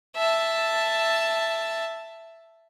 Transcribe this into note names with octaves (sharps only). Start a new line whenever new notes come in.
E5 A5